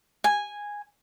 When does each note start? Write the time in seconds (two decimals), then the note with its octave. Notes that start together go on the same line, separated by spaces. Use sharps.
0.24 G#5